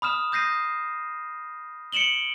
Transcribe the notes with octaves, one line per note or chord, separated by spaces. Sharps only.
B5 D#6 F6 E7
D#6 G6 A#6 C7 D#7
C#7 D7 E7 F#7 G7